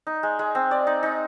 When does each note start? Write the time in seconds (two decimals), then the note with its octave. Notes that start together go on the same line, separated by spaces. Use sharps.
0.07 D#4
0.23 G#3
0.39 G#3
0.55 C4
0.71 D5
0.87 D#4
1.03 D#4